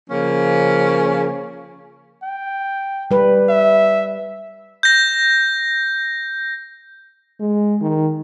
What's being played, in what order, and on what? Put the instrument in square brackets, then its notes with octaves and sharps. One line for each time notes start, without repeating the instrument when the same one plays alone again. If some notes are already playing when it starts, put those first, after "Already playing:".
[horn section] C#3 F3 A#3 C#4
[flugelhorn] G5
[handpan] G3 B4
[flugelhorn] E5
[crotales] G6 A#6
[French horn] G#3
D#3